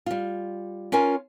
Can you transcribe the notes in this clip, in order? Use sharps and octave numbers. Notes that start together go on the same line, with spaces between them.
G3 F4
C#4 F4 A#4 G#5